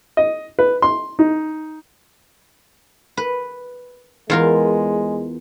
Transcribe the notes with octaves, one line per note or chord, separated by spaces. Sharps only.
D#5
B4
C6
D#4
B4
E2 G#3 F4 A#4